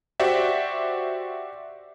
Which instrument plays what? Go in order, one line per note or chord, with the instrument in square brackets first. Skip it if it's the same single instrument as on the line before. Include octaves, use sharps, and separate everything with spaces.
[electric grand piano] F#4 G4 C5 D5 E5